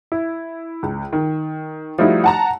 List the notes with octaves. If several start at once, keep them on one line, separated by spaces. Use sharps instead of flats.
E4
C#2
D#3
F3 G3 A3 D#4 E4 F#4
F#5 A5 A#5